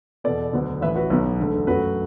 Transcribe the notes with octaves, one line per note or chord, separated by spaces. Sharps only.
E2 B2 B3 A4 D5
D2 D3 F#3 B3
A1 A2 E3 B4 E5
F#4 B4
B1 B2 B3
E1 D2 D3 A3
F#2 F#3 A3 F#4 B4